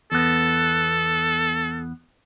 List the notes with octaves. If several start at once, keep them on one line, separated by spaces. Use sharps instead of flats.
E2 B3 A4